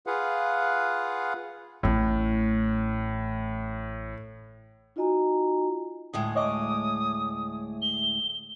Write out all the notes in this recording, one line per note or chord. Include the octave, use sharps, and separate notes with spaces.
F4 G#4 B4 F5 F#5
A1 A2 C#4
D#4 F4 F#4 D#5 G#5 A#5
D2 A2 G#3 D#6
C#5 D#5 D6 D#6
G7